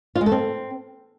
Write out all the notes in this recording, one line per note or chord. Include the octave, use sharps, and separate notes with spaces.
F4
G#3
A4
C4